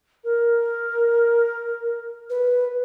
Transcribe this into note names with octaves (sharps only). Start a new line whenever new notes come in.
A#4
B4